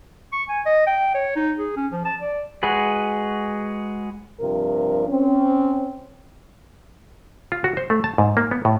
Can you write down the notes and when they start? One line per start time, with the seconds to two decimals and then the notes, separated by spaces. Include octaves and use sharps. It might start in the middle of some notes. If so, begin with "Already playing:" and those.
0.33 C#6
0.49 G#5
0.66 D#5
0.87 G5
1.14 C#5
1.36 D#4
1.58 G#4
1.76 C#4
1.92 F3
2.05 A5
2.21 D5
2.63 G#3 F#4 G#4 B4
4.40 G2 C3 F3 A#4
5.08 C4 C#4
7.52 F4
7.64 F#4
7.77 C5
7.90 A3
8.04 A5
8.18 G#2
8.37 A#3
8.51 B3
8.65 A2